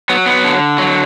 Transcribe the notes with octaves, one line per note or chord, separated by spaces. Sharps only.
F#3 B3
B3
D3
F#3